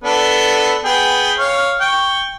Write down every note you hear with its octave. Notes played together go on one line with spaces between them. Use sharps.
B3 D4 A4
B3 G#4 G5
C#5 F5
G5 C#6